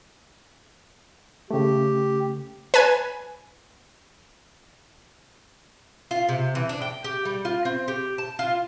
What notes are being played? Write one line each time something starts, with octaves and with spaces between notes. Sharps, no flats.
C#3 A3 G4
B4 G#5
F4
C3
E3
D4
G5
G4
G3
F4
C4
G4
A5
F4